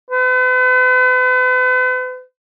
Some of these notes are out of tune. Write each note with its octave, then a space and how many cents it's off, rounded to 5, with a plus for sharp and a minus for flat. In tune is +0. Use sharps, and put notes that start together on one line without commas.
B4 +45